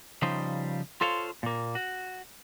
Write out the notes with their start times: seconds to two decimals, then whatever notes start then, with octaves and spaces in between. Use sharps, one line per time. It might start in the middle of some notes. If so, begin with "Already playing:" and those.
0.22 C#3 F3 G3 D#4 C5
1.01 F4 A4 C5 C#5 F5
1.43 A#2 A#3
1.75 F#4